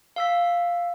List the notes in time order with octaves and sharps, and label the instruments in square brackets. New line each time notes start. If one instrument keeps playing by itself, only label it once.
[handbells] F5 E6 B6